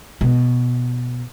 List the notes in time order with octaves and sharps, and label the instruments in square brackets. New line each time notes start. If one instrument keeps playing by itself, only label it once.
[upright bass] B2